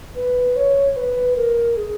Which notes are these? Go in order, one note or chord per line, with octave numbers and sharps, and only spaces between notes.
B4
C#5
B4
A#4
G#4